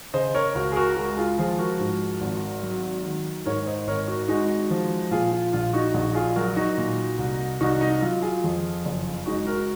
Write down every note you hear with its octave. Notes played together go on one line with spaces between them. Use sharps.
C#3 C5 D#5
A#4 C#5
C#2 F#4 A#4
G#4
F#4 A#4
G#3 F#4 A#4
F4 G#4
F3 F4 G#4
F#4 A#4
G#2
G#1
F#3
D#3
G#2 A#4 C#5
C5 D#5
G#1 A#4 C#5
F#4 A#4
G#3 D#4 F#4
F3
A#2 F4 G#4
F4
A#1 F4
D#4 F#4
A#1 D#4 F#4
F4 G#4
F#3 F#4 A#4
D#4 F#4
A#2
C2
C2 D#4 F#4
D#4
F#3 F4
F4 G#4
F2
F#1
G#3 D#4 F#4
F#4 A#4